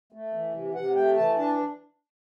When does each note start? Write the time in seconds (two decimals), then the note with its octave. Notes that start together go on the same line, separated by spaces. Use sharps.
0.12 A3
0.34 E3
0.54 C3
0.74 C3 F#5
0.95 A3 G5
1.17 E3 A5
1.37 D4 A5